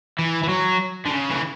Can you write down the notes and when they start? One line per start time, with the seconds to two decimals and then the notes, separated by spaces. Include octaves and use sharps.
0.19 E3
0.43 E3
0.49 F#3
1.06 D3
1.10 C#3
1.30 E3